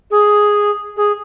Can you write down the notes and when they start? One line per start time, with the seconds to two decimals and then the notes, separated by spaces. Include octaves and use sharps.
0.11 G#4
0.97 G#4